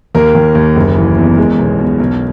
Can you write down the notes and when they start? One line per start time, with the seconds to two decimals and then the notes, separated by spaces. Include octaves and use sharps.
0.15 D#2 A#4
0.35 D#2
0.55 D#2
0.76 F#1
0.96 E3
1.17 E2
1.37 G#3
1.59 B1
1.78 B2
2.00 B1